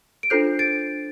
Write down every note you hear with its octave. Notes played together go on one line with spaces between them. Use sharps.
D7
D4 F4 A4 C5 G6 C7
A6 D7